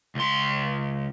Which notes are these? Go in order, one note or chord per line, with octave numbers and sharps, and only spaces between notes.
C#2 C6